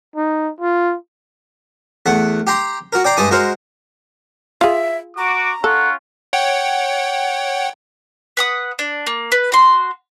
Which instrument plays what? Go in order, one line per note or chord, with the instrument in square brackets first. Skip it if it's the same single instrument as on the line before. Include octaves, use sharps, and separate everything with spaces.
[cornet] D#4
F4
[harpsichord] E2 A3 F#5
G4 G5 A#5 C6
F#4 A#4
D5 G5 A#5 C6
G2 G#3 D#4 A5 D6 D#6
G#3 F#4 A#4 C5
[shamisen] F4 G#4 [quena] E5
[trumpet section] F#4 D6 [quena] A#5
[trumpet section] C#4 F4 C#6 [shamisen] A4 [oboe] F#5
[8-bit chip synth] C#5 F#5 G5
[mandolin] B4 F#5 D#6
D4
A#3
B4
F#4 C6